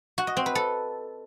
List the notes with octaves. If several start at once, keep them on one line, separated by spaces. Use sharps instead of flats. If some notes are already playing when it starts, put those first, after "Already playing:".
F#4
D#5
C4
B4
A4